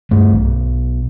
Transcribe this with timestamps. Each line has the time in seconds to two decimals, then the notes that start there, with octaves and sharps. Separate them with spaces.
0.11 G2 A3
0.34 B1